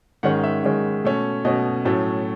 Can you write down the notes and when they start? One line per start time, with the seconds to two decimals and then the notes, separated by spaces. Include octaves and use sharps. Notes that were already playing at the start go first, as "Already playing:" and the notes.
0.23 G#2 D#3 G#3 C#4 F#5
0.44 E5
0.63 G#2 D#3 G#3 C#4
1.04 B2 A3 C#4
1.45 B2 A3 C#4 D#5
1.85 A2 F#3 A3 C#4